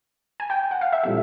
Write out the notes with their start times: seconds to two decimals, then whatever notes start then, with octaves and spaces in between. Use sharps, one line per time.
0.40 G#5
0.50 G5
0.71 F#5
0.81 F5
0.93 E5
1.03 A#2 G3 C4 E4 A4 E5